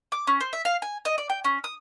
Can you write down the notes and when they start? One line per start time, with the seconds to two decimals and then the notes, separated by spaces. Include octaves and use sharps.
0.12 D6
0.27 C#4
0.41 C5
0.53 E5
0.65 F5
0.82 G#5
1.05 D#5
1.18 D5
1.30 G5
1.44 C#4
1.64 D#6